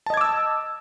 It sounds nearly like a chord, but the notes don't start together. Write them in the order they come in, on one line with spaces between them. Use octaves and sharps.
A5 D#5 G#6 D6 E6